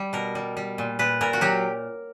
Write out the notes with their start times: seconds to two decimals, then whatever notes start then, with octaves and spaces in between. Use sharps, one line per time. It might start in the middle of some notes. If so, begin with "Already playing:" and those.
Already playing: G3
0.13 B2 A#4
0.35 G3
0.57 G3
0.78 A#2
0.99 A#2 B4
1.21 A#2 A#4
1.33 F#4
1.41 F#3 G4